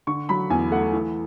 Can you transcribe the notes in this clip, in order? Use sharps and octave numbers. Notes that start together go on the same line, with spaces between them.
D3 C#6
F#3 B5
E2 G#5
A3 F#5
E3